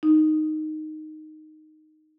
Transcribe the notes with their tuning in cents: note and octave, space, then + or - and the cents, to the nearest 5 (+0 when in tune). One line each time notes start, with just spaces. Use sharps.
D#4 -5